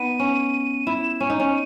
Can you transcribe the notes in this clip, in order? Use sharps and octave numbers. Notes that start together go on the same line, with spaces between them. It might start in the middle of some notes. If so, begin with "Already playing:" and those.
Already playing: B3 D#4 D#7
C#4
E4 E7
C#4 D#7
D#4
C#4